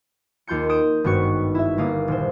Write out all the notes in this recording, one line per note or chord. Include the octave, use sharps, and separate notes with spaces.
D#2 F4 C6 G6 C#7
D#6 G6 D7 E7
G#1 G2 B3 F#4 C#6 C#7
E4 E5
G1 A#3 F5 D#6
D#1 C5